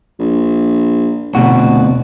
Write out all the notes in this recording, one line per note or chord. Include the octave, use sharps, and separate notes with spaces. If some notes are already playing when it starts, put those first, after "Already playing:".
A#1
F1 D2 B2 F#4